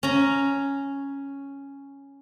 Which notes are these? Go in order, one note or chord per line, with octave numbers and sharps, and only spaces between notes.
C#4 A#5